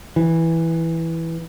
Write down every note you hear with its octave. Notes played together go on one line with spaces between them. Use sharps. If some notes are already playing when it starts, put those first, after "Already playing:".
E3